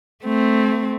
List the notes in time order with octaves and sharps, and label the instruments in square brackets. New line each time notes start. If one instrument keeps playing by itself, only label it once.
[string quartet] A3 C4